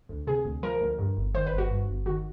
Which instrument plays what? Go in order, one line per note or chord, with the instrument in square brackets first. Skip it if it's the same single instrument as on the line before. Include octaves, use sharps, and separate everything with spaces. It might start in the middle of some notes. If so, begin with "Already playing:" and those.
[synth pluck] D2
C3 G#4
D2
F3 A#4
D2
G2
G1
D#3 C5
B4
G1
F#4
G2
G1
D#3 F#4